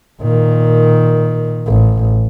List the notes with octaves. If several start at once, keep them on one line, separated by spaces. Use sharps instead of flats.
A#2 D#3
A1